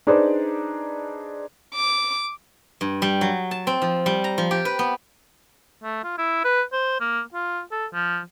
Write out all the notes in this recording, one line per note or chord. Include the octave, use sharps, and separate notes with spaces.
D4 D#4 G#4 B4 C5 D5
D6
G2
G3
F#3
A5
C4
F3
G3
A#5
F3
G4
B4
B3
A3
F4
E4
B4
C5
A#3
F4
A4
F3